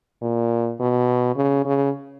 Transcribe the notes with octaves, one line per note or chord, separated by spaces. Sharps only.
A#2
B2
C#3
C#3